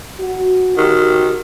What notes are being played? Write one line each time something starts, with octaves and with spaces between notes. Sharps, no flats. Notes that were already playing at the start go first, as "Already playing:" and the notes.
F#4
D#3 F#4 G4